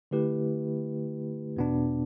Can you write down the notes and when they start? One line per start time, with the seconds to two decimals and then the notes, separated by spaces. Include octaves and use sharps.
0.11 D3 A3 E4 G4 B4
1.56 E2 B2 B3 D4